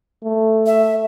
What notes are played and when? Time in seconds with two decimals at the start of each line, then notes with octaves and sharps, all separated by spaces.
0.24 A3
0.66 E5